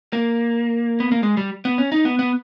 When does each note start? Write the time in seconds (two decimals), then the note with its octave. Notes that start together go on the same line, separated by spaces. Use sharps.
0.13 A#3
1.00 B3
1.12 A#3
1.23 G#3
1.37 G3
1.65 B3
1.78 C#4
1.92 D#4
2.05 B3
2.19 B3